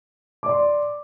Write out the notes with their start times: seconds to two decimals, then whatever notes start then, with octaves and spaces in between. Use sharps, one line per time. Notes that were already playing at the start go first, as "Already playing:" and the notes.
0.43 D6
0.46 D5
0.49 C6